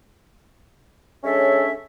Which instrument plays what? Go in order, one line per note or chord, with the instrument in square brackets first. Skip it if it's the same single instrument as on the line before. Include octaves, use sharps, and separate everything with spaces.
[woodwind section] G#3 C#4 D4 A4 C#5 E5